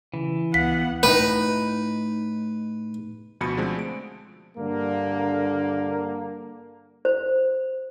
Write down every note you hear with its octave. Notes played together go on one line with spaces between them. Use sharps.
C#3 E3
C#2 B3 F5 F#5 B6
A2 D#4 B4
D2 B2 F3 F#4 B5 C#7
D3 F3 G#3 A3 C4 G#4
D7
G2 D3 A#3
C5